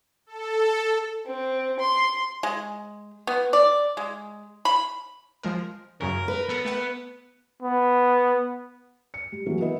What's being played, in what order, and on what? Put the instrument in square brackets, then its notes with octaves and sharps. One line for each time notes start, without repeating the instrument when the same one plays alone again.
[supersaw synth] A4
[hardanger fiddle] C4
C6
[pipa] G#3
B3
D5
G#3
B5
[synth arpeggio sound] F3 G#3 A#4
[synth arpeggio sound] F#2 C#3 C#4 [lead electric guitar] A#4
[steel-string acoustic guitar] B4
[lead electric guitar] B3 [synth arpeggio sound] A4 A#4 A#5
[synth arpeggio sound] A3 E5 F#5
[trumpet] B3
[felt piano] C#7
G3
E3 F#3 A#3 G#4
B3 E4 A#4 D#5